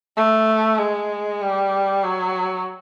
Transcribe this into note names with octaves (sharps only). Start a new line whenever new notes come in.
A3
G#3
G3
F#3